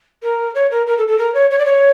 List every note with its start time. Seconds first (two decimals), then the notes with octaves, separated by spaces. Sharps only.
0.22 A#4
0.55 C#5
0.71 A#4
0.86 A#4
0.98 A4
1.08 A4
1.18 A#4
1.34 C#5
1.50 C#5
1.59 D5
1.65 C#5